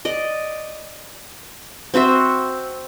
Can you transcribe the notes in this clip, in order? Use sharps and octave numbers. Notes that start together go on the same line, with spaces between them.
D5 D#5
C4 F#4 C5 E5